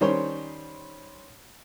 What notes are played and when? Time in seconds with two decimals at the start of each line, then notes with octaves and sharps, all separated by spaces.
0.01 D#3 G3 C#4 C5 C#5 C6